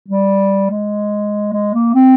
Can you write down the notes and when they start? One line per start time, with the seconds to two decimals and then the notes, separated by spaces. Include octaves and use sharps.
0.09 G3
0.71 G#3
1.53 G#3
1.74 A#3
1.95 C4